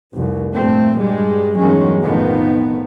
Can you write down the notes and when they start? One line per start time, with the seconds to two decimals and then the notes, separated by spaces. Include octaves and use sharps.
0.13 F1 C2
0.53 G2 A#2 A3 C4
0.98 G2 G3 G#3
1.59 E2 G2 D#3 F#3 G#3 C#4
2.01 B1 F2 A2 D#3 F3 B3